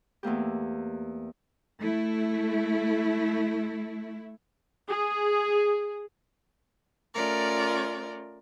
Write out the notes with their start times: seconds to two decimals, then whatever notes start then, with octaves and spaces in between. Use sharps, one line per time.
0.23 E2 A3 A#3 G4
1.80 A3 E4
4.88 G#4
7.13 A3 C#4 F4 A#4 D5